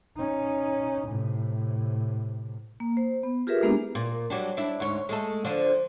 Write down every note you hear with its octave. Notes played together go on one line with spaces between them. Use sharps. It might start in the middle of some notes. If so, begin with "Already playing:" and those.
C#4 D#4
A2 C3
A#3
C5
B3
F4 G4 G#4 A#4 B4 E5
G#3 A#3 B3 D4 E4 G4
A#2
F#3 G3 D4
D4 E4
D2 G#2 C#5
G#3 A3 A4
D3 F3 D4